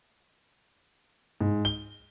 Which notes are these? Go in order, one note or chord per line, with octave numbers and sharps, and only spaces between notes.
G#2
G7